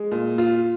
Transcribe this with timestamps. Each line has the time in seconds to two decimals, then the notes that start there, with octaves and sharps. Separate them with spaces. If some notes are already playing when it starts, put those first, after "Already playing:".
Already playing: G#3
0.11 A#2
0.38 F4